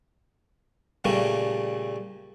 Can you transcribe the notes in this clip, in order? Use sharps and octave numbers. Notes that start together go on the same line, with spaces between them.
A#2 C#3 G3 A3